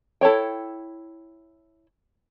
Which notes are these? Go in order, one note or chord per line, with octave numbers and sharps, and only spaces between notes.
E4 A4 B4 C#5 G5